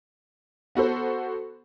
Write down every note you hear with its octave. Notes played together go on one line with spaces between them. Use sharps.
B3 F#4 A4 C5